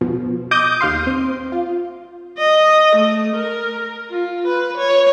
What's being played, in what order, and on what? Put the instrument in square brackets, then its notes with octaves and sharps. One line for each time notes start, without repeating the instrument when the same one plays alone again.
[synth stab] B2 F3
D#5 D6 D#6 G6
D#2 F5 C6
C4
F4
[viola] D#5
A3
A#4
F4
B4
C#5